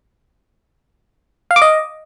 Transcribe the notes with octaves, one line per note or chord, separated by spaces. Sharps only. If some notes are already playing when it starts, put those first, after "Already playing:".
F5
D6
D#5